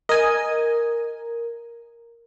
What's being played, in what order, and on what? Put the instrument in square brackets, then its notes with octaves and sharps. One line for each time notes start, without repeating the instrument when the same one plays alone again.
[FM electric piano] A#4 [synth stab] D#5 G#5